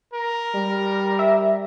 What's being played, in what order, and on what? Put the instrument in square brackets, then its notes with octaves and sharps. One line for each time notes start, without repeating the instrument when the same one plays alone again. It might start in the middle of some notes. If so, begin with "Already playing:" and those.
[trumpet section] A#4
[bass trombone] G3
[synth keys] E5